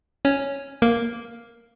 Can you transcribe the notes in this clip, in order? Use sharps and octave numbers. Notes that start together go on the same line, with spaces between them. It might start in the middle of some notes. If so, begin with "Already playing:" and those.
C#4
A#3